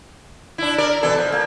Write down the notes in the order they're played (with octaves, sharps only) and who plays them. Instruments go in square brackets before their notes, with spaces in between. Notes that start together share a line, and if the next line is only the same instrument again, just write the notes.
[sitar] D4 E4
A#4 D5
B2 E3 A4
F3
A#3